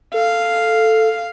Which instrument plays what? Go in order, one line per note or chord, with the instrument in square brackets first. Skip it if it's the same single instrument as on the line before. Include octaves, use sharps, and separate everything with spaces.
[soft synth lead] A4 [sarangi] F5